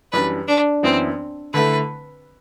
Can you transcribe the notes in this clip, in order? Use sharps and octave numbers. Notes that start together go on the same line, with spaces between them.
F#2 E3 G3 D4 B4
D4
F#2 E3 B3 C4 E4
D3 A3 E4 B4